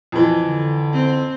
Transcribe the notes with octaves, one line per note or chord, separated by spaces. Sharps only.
F2 E3
D3
C4